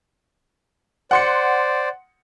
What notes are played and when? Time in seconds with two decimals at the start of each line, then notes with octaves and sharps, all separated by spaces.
1.11 C5 D5 F#5 C6 C#7